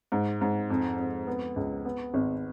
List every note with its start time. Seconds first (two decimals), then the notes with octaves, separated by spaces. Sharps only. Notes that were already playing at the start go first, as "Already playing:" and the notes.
0.12 G#2
0.41 G#2
0.70 F2
0.99 F2
1.27 B3
1.56 C#2
1.85 B3
2.14 G#1